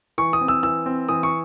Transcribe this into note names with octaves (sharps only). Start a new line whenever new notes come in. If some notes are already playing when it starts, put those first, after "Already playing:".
E3 C#6
D#6
C4
E6
E3 E6
C4
E3 D#6
C#6